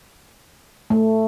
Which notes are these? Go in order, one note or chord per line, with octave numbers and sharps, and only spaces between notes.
A3